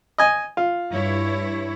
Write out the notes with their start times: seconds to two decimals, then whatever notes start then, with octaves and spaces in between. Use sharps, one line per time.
0.18 D#5 G#5
0.57 F4
0.91 G2 E4 C#5